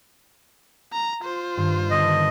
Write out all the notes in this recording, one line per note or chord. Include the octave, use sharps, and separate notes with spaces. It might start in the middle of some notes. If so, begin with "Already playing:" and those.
A#5
F4 C5
G2 D#3
D3 B3 D4 D#5